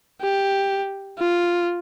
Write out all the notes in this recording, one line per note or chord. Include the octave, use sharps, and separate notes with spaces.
G4
F4